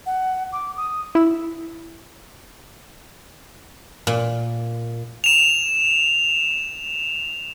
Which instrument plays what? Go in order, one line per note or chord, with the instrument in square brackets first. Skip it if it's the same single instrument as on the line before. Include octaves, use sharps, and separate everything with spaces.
[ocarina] F#5
D6
D#6
[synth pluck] E4 E6
[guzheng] A#2
[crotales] E7 F7